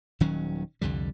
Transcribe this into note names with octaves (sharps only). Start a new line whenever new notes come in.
D#1 D#3 F#3 C#4
C2 F2 D3 G3